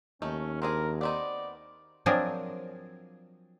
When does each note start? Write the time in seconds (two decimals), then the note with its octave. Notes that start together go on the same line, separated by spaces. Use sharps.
0.22 D#2 A3 C#4 D#4
0.62 C4 D4 G#4 A#4
1.01 B3 C4 D#4 D5
2.06 F3 F#3 C4 D4 G#4 A#4